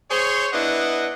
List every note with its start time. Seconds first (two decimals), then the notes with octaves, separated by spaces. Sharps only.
0.10 G#4 C5 C#5
0.52 B3 D4 E4 B4 D#5 F#5